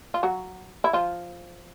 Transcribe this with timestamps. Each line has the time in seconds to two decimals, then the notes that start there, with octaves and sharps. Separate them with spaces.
0.14 F4
0.23 F#3 F#4
0.84 E4
0.93 F3 F4